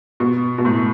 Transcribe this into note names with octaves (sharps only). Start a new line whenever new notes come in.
B2
B2
A2